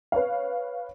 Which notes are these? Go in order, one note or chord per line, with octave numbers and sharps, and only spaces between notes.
B4 C#5 F5